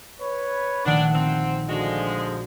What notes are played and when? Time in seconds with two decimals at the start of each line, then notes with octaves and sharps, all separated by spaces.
0.20 B4 C#5
0.85 A#1 D#3 A3 D4 F#5
1.14 C4
1.69 D3 F3 G#3 F#4